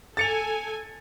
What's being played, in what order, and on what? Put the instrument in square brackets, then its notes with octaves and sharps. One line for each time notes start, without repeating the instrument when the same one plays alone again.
[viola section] A4 G#5 [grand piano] A6 C#7 F7